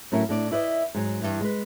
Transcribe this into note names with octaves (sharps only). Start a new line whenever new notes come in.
A2 F#3 C#4 E4 A#4 G#5
A2 D4 D5
E4 B4 D5 D#5
G#2 F#3
G2 E3
G#3 B4